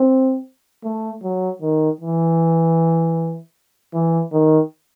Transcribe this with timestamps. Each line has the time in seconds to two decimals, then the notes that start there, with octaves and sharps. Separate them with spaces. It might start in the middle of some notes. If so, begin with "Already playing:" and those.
Already playing: C4
0.84 A3
1.23 F#3
1.62 D#3
2.01 E3
3.94 E3
4.32 D#3